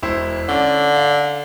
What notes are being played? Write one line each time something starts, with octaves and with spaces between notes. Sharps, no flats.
E1 E4 C5
D3 C#4 D5
F5